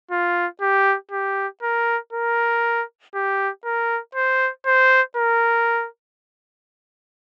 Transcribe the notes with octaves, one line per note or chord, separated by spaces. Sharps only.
F4
G4
G4
A#4
A#4
G4
A#4
C5
C5
A#4